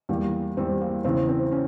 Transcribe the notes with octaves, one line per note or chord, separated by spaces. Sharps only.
E2 E3 G3 A#3
E2 E3 G3 C4
A#3
E2 C#3 E3 C4
C4
C#4